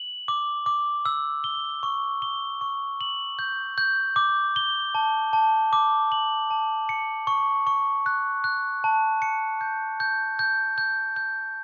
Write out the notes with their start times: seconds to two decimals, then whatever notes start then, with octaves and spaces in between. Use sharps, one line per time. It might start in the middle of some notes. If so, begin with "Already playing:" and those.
Already playing: F#7
0.28 D6
0.66 D6
1.06 E6
1.44 G7
1.83 C#6
2.22 G7
2.61 C#6
3.01 F#7
3.39 G6
3.78 G6
4.16 D6
4.56 G7
4.95 A5
5.33 A5
5.73 D6
6.12 F#7
6.51 A5
6.89 C#7
7.27 C#6
7.67 C#6
8.06 F#6
8.44 F#6
8.84 A5
9.22 C#7
9.61 G6
10.00 G6
10.39 G6
10.78 G6
11.16 G6